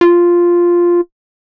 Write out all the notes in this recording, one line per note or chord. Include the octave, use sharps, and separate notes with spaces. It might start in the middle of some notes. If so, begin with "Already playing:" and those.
F4